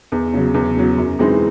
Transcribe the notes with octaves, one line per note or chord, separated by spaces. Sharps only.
E2
C#3 F#3
E2
C#3 F#3
F#2
E3 G#3 C4 D#4